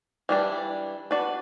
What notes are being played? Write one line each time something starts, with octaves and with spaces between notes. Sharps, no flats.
E3 G3 D4
D4 F#4 B4 D5